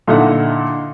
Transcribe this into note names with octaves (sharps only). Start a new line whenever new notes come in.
A#2 D3 D#4 E4 E5 F#5